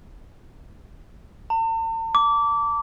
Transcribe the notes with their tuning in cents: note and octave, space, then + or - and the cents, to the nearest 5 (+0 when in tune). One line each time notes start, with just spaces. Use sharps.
A5 +45
D6 -20